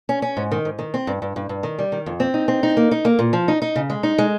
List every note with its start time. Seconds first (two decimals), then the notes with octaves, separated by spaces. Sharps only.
0.09 C#4
0.22 C#4
0.37 G#2
0.51 D#3
0.65 G#2
0.79 D#3
0.94 C4
1.07 G2
1.22 G2
1.36 G2
1.49 G2
1.63 D#3
1.79 G3
1.92 D#3
2.06 F2
2.20 C4
2.34 D#4
2.48 C4
2.63 D#4
2.77 A#3
2.91 D#4
3.05 A#3
3.19 A#2
3.33 F3
3.48 D#4
3.62 D#4
3.76 C#3
3.90 G#3
4.03 D#4
4.18 G#3